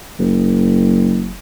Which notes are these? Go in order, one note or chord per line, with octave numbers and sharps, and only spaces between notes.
F#1